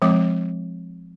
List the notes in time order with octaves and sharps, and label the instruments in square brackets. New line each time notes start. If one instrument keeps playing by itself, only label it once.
[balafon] F3 G#3 C4 D6